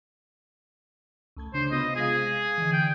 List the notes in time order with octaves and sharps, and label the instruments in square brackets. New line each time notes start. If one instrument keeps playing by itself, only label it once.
[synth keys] C#2 A3 G#6
[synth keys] C#3 D4 [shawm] C5
[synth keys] C3 B3 F4 [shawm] D#5
[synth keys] C3 G#3 F5 [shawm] G#4
[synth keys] D3 E3
[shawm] G5